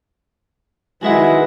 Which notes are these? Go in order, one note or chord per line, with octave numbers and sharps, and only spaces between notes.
D#3 G#3 E4 F#4 B4 E5 F#5